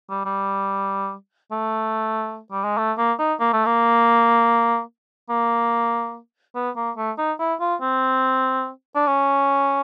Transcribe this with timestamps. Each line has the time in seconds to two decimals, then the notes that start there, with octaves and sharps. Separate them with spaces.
0.10 G3
0.25 G3
1.52 A3
2.52 G3
2.64 G#3
2.78 A3
2.98 A#3
3.19 D#4
3.40 A#3
3.53 A3
3.66 A#3
5.30 A#3
6.55 B3
6.76 A#3
6.97 A3
7.18 D#4
7.40 E4
7.60 F4
7.81 C4
8.95 D4
9.07 C#4